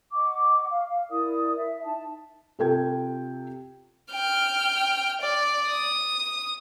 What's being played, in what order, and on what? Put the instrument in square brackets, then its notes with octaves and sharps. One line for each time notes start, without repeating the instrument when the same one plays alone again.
[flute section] D#5 F#5 C#6 D6
F5
F5
E4 A#4 D5 D#6
E5
D#4 A5
[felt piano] C3 F4 A4 G5 G#6
[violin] G5 F6
D5
D#6